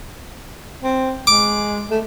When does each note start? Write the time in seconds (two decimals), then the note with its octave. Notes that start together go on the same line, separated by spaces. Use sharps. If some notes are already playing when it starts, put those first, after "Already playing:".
0.83 C4
1.27 G#3 D6
1.90 A3